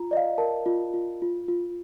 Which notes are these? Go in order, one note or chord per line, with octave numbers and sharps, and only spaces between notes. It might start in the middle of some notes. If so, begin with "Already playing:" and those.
Already playing: F4 A#5
D5 D#5
F5
A#4 A5
F4
F4
F4
F4